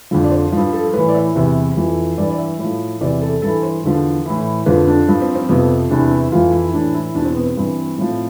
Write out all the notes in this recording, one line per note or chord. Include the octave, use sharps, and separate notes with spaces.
F2 D3 F3
D5
C5
G2 F3
A4
A2 E3 B4
D5
E5
E2 C3 E3
F2 E3
G2 E3 D5
D5
E5
A2 F3
E2 C3 E3 D5
A4
G2 E3 A4
C5
E2 D3 F3
A2 E3
F2 D3 F3 B4
D4
G2 F3
C4
C4
F2 C3 F3 B3
E2 C3 E3 D4
E4
F2 E3 F4
E4
A2 E3 D4
E4
E2 B2 D4
C4
B3
C4
G2 E3
A2 F3